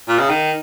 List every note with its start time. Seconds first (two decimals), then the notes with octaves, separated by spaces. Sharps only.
0.08 A#2
0.19 C#3
0.29 D#3